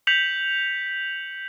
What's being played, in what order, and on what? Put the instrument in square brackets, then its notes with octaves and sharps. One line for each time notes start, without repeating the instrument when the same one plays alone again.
[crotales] G6 B6 C#7 F7 F#7